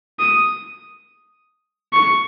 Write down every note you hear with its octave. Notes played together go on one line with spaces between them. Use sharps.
D#6
C#6